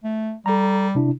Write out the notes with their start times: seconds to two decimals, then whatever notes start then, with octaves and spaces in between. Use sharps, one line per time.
0.04 A3
0.46 G3 A4 A#5
0.95 C3 D4 E4